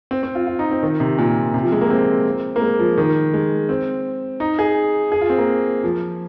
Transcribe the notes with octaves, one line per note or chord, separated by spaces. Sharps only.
C4
C4
F4
F4
D#4
C4
D#3
C3
A#2
C3
F3
G#3
A#3
C4
A#3
G#3
F3
D#3
G#3
C4
D#4
G#4
G#4
F4
C4
A#3
F3